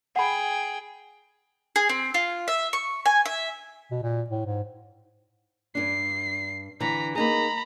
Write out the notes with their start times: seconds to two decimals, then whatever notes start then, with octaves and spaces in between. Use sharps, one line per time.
0.16 G#4 F#5 G5 B5
1.76 G#4
1.89 C4
2.14 F4
2.48 E5
2.73 C#6
3.06 G#5
3.25 E5
3.91 B2
4.03 A#2
4.30 A2
4.46 G#2
5.75 G2 D4 C7
6.80 D3 E3 A#5 B6
7.15 A#3 D#4 G#4 A#5 B5